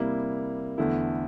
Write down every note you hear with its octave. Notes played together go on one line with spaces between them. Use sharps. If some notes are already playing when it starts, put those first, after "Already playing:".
Already playing: C3 G3 A#3 E4
E2 D3 A3 E4